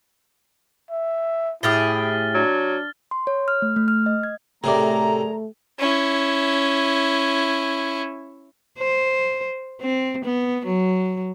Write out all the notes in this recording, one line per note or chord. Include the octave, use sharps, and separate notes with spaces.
E5
A2 E4 G4 G#4 F6 A6 G7
F#3 D4
C6
C#5
F6
A3
A3
F6
D#5
G#6
A2 C3 A3 G#4 A#4 D5 A#5
C#4 E4
C5
C4
B3
F#3